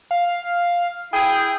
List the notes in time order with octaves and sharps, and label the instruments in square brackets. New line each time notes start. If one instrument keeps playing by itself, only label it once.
[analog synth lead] F5
[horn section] E4 G#4 [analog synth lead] G5